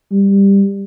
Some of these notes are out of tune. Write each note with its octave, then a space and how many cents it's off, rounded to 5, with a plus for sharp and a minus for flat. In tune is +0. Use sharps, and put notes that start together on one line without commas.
G3 +15